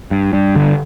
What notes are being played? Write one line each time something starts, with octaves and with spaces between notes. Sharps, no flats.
G2
G2
D3